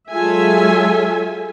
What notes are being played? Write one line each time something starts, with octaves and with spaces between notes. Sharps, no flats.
F#3 G#3 F4 A4 E5 G#5